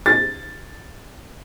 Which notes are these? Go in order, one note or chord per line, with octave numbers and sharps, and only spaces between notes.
A6